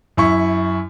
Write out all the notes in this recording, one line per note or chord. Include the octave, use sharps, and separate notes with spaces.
F#2 E4 C#6